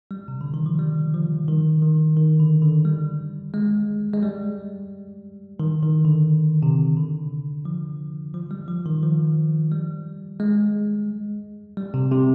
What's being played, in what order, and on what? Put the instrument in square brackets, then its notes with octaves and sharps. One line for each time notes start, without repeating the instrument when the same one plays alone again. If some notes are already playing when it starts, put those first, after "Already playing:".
[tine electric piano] G3
C3
D3
D#3
F3
G3
F3
D#3
D#3
D#3
D3
D3
G3
G#3
G#3
G3
D#3
D#3
D3
C3
D3
F3
F3
G3
F3
D#3
F3
G3
G#3
G3
C3
C3